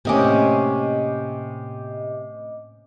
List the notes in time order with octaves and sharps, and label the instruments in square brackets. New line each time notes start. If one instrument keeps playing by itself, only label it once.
[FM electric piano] A2 D#5 D6 [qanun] C3 A#3 C#4